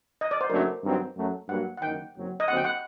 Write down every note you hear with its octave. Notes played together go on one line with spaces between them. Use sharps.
D#5
D5
C5
F#1 F#2 F#3 A3 D4 A#4
G2 D#3 F#3 C4 D#4
F#2 F#3 A3
G2 F#3 A#3 F#5
F#5
F#1 F#2 D#3 G5
F#1 F#2 F#3 C4
D#5
D#2 D3 F#3 C4 F#4 F#5
G5
F#5